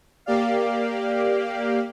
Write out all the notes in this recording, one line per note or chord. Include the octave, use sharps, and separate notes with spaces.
A#3 G4 D5 F5